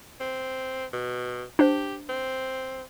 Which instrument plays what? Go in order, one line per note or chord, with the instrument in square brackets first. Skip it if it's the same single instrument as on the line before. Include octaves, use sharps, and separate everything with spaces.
[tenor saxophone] C4
B2
[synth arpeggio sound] D4 C5 [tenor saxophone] G4
[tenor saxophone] C4